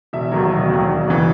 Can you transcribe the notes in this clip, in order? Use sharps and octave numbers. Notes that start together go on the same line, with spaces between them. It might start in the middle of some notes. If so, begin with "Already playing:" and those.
E1 E5
D#2 D#3 F#3
E1
D#2 D#3 F#3
E1
D#2 C#3 E3